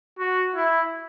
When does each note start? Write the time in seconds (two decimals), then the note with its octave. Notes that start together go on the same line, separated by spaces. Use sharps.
0.19 F#4
0.55 E4